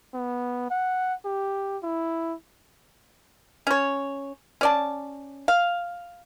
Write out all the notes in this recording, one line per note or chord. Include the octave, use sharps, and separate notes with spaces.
B3
F#5
G4
E4
C#4 C#5
C#4 D5 A5
F5